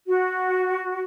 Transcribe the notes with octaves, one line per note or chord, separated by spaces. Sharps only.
F#4